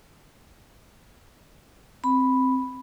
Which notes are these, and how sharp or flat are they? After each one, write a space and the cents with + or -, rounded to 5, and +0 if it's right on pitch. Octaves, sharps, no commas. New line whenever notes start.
C4 +0 B5 +0